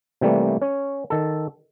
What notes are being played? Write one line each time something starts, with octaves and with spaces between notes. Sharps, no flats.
C3 E3 G3 A3 A#3
C#4 C#5
D#3 A4